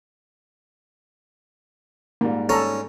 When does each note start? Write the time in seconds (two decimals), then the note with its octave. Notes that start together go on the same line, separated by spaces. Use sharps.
2.21 G#2 G3 A#3
2.49 C#4 A4 A#5